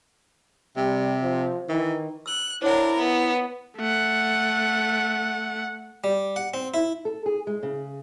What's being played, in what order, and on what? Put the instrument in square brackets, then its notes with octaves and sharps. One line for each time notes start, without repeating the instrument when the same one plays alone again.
[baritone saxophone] C3 [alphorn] G3
[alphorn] F3
[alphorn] D#3 [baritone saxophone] E3
[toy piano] E6 [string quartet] F#6
[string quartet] D4 A#4 [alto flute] E4 [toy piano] C5 C#5 F#5
[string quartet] B3
[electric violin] A3 F#5
[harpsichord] G3
F#5
C4
E4
[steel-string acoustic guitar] A4
G#4
G#3
C#3